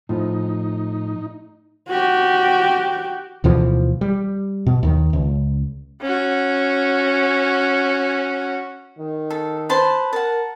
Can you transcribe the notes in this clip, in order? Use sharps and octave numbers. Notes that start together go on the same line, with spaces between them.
A2 F3 D#4
F#4 G4
D2 B2 E3 F3
G3
B2
D#2 D#3
C#2
C#4 F#4
D#3
A4
B4 C5 A5
A#4 F#5 A5